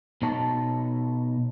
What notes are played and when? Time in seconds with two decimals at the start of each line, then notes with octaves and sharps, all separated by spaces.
0.22 B2 D#4 C#5 A5